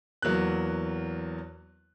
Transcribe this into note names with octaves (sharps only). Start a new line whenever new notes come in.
E2 F#3 A#3 F#6